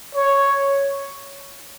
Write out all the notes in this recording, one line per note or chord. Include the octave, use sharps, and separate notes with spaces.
C#5